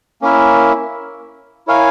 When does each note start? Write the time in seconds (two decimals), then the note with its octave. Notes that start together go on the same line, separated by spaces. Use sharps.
0.22 A#3 C#4 E4 A#4 E5
1.67 E4 A#4 C#5 F5 G#5